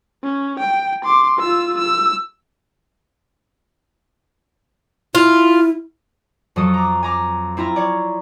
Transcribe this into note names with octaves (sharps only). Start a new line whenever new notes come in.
C#4
G5
C6 D6
F4 E6
E6
E4 F4
F2 F#3 A4 D#6
A#5 D6
G#5 A#5 D6
C4 E4 F4 A#5
C#5 D5